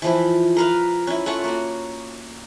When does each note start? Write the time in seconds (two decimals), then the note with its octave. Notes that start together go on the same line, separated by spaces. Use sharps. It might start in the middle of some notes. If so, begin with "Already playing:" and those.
0.02 E3 F3 E4
0.57 A#4 B4 F5
1.07 C#4 E4
1.26 A3 C#4 F4 F#5
1.44 A#3 F#4